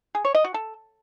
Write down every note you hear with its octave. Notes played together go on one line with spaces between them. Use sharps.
G#4
C#5
D#5
F#4
A4